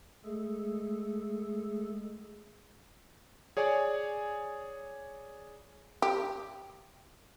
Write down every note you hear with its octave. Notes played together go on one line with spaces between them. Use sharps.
G#3 A3 G#4 A4
G#4 C#5 D5 G#5
G4